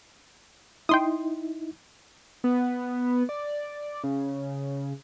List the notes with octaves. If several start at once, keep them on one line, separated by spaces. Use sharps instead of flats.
D#4 E4 G5 C6 D#6
B3
D5
C#3